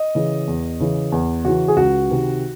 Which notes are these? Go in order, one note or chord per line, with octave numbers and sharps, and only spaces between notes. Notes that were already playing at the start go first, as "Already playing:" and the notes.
Already playing: D#5
C#3 E3
E2
C#3 E3
E2
C#3 E3 F#4
G#4
C#2 F#4
C3 D#3